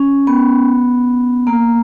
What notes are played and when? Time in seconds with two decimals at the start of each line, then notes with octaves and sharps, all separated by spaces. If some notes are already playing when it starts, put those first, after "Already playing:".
Already playing: C#4
0.27 B3
1.47 A#3